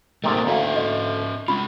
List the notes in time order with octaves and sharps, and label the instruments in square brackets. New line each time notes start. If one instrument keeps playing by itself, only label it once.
[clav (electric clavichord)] G#2 C3 D#3 [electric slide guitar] A3 A#3 D5
[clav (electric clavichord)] D2 [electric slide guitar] C#4 E5 F5
[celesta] D#5
[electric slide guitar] G#3 C#4 F4 [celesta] B5